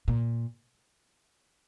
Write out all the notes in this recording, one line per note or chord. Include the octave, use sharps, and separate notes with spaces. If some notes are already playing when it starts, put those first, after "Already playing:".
A#2